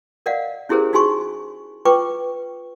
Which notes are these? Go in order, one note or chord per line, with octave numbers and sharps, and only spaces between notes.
A#4 D5 D#5 F5 F#5
C#4 E4 G4 G#4 A#4 C5
D#4 F#4 G#4 G#5 C6 C#6
F4 B4 G5 C#6 D6